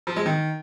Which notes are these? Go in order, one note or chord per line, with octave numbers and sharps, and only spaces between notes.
F3
G#3
D#3